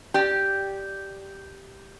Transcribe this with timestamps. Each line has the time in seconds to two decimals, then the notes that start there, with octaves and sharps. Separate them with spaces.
0.14 G4 D5